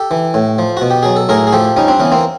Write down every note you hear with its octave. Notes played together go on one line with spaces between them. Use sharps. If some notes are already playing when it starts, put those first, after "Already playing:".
Already playing: G4 A4
E3
A2
F3
B2 F#4
G4
F#3 G#4
A4
A2 G#4 A#4
G#4
F3 G4 A4
G3 C#4 D#4
C4 D4
E3 B3 C#4
A#3 C4